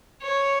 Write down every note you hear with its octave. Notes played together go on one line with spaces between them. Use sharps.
C#5